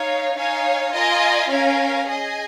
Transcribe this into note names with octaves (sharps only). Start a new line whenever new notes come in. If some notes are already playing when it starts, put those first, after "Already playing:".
Already playing: D#4 C#5 F5
D#4 C#5 F5 G#5
F4 A#4 D#5 G#5
C#4 A#4 F5 G#5
G#4 D#5 G#5